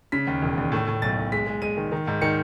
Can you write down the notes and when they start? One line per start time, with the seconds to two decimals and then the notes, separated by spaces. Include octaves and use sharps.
0.12 C#3 B6
0.27 D#2
0.42 E1
0.57 D#2
0.72 A2
0.87 A2
1.02 B1 A6
1.17 B1
1.32 G#3 B6
1.47 G#3
1.62 G#3 D#7
1.77 D#3
1.92 D#3
2.07 G#2
2.22 D#3 C#7